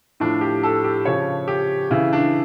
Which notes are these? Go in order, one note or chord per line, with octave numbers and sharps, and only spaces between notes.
A2 F3 D4
G4
A4
G4
C#3 F3 C#5
G4
C#3 E3 E4
D4